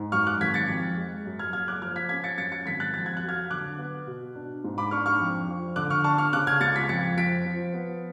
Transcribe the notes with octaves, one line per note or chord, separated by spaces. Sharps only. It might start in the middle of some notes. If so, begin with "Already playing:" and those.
Already playing: G#2
F#2 C#6 F6
D6 F#6
G#1 G#6 B6
A6 C#7
F2
G#3
F#2
F6 G#6
F#1 F6 G#6
D6 F#6
F3 F6 G#6
G#6 B6
C#4 G#6 B6
A6 C#7
F#2 A6 C#7
A6 C#7
G#1 G#6 B6
F#6 A6
F2 A6
G#6
F#6
F#3
F6 G#6
D3 D6 F#6
B3
B2
D4
G#2
B5 D6
D4 C#6 F6
C#6 F6
F2
F3
D3 D6 F#6
C#6 F6
D4 A5 C#6
C#6 F6
C#3 D6 F#6
F6 G#6
C#2 A6 C#7
G#6 B6
F2 A6 C#7
F3 B6 D7
F3
B3